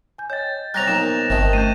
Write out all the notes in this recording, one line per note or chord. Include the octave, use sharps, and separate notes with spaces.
G#5 G6
C#5 D#5 G5 G6 A6
C3 F#3 G3 A#5 F#6 A#6 F7
B1 A#2 F3 D#4 A#5 E7
G1 F2 C3 D#3 E5 A5
A3 C#4 G6 D#7